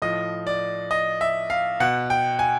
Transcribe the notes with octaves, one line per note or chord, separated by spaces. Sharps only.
A2 F3 D#5
D5
D#5
E5
F5
B2 F#5
G5
G#5